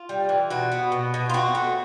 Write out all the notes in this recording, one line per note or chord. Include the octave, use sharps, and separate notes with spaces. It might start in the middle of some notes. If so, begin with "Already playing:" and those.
Already playing: F4
G3
E3
B2 F#4
B3
B2
B2
F4
C4 F#4
A3